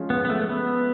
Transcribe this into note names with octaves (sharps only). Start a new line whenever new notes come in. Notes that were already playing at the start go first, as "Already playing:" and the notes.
Already playing: F3 G#3 C#4 F4
B3
B3
A3
B3